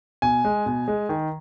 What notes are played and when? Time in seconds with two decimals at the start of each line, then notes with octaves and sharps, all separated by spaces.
0.22 B2 G#5
0.45 G#3
0.66 B2
0.88 G#3
1.09 D#3